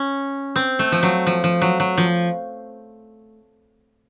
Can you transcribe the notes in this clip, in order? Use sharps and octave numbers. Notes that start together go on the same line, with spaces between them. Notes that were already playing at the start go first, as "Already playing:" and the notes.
Already playing: C#4
C4
A3
F3
F#3
F3
F3
F#3
F#3
F3